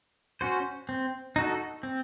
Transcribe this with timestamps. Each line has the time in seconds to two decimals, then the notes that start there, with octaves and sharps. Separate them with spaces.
0.41 C#4 F#4 C5
0.89 C4
1.36 D#4 F#4 A4
1.83 C4